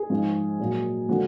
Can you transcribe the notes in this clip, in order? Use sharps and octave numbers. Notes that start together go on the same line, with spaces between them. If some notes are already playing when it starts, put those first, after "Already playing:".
Already playing: G#4
G#2 F3 G#3
A#2 F#3
D3 F3 G#3 F#4